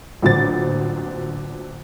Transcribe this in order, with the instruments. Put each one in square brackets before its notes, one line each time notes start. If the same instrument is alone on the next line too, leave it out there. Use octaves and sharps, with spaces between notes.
[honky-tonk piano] A1 A#2 D3 F#3 C4 A6